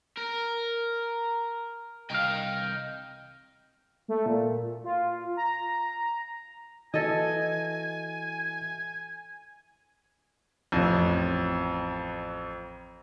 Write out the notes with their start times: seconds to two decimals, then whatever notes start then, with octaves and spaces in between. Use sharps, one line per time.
0.17 A#4
2.10 C2 D#5 F5 G5
4.08 A3
4.26 A#2
4.84 F4
5.37 A#5
6.94 E3 F#4 A4 D#5 G#5
10.72 A1 F2